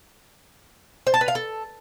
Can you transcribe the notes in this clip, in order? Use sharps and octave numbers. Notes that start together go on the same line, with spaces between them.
C5
A5
B4
F5
A4